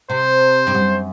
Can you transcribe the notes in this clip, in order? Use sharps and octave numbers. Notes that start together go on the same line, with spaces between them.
C3 C5
G2
F#2